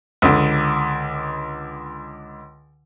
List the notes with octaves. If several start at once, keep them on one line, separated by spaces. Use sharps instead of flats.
C#2 D3